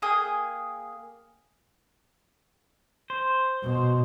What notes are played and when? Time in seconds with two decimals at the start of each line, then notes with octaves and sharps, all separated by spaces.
0.02 A#3 G#4 G5 D#6
3.10 C5
3.63 B2